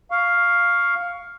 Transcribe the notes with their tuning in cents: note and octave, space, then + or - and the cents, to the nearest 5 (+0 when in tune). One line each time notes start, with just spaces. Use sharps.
F5 +5 C#6 +20